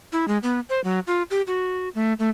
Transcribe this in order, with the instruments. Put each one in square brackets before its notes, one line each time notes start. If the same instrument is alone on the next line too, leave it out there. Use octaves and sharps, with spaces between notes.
[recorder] E4
G#3
B3
C5
F#3
F4
G4
F#4
A3
A3